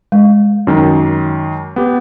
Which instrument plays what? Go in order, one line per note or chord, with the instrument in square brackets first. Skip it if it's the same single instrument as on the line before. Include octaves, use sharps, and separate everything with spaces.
[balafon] G#3
[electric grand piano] F#2 D#3
B3 G4